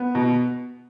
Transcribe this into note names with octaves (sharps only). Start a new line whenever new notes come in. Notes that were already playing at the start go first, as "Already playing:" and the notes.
Already playing: B3
B2